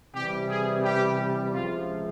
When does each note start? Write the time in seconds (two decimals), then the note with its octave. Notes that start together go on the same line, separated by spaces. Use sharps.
0.15 C3 E3 G3 G4
0.49 G#4
0.85 G4
1.54 C#2 C3 F3 F4